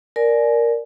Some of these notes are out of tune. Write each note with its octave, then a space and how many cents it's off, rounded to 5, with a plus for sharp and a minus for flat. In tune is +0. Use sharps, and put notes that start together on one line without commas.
A#4 +0 D5 +0 G#5 +25